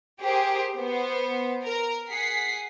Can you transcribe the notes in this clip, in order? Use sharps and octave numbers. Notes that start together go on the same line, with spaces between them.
G4 G#4 A#4 C5
B3 C5
A#4
G#4 F#5 B6 C7